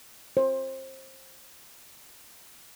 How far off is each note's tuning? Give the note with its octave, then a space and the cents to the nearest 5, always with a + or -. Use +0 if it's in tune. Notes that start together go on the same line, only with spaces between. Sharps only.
C5 +25